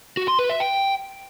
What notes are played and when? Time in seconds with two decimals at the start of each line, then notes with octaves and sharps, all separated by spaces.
0.17 F#4
0.28 C6
0.39 B4
0.49 E5
0.60 G5